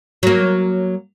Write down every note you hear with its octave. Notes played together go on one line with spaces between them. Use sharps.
F#3 A#3